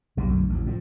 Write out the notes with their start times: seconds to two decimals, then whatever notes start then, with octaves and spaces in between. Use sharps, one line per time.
0.17 B1 B2 G3
0.28 B1 F#2 D3 A3
0.49 A1 D2
0.66 A2 F3